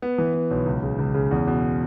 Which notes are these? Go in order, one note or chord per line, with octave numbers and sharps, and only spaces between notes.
B3
E3
B3
B1
C#2
C#3
C#2
C#3
E2
B2